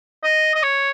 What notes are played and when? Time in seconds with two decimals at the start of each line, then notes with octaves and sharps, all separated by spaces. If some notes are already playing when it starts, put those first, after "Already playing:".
0.24 D#5
0.55 D#5
0.63 C#5